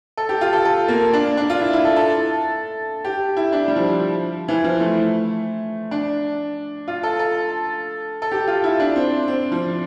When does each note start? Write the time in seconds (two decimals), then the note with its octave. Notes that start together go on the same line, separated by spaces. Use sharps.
0.17 A4
0.29 G4
0.41 F4
0.53 A4
0.65 A4
0.88 A#3
1.13 D4
1.37 D4
1.50 F4
1.60 E4
1.73 E4
1.85 A4
1.96 A4
3.04 G4
3.37 E4
3.52 D4
3.68 G3
3.76 F3
4.48 E3
4.64 F3
4.80 A3
5.91 D4
6.88 F4
7.03 A4
7.19 A4
8.22 A4
8.31 G4
8.48 F4
8.64 E4
8.80 D4
8.96 C4
9.28 C4
9.52 F3